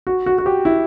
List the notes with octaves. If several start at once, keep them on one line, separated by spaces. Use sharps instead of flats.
F#4
F#4
F#4
G4
E4